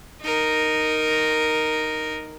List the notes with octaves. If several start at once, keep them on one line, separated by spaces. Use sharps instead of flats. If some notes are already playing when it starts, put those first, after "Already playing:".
D#4 A#4